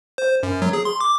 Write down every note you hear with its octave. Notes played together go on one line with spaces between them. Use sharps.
C5
F#2
F#3
G#4
C6
D6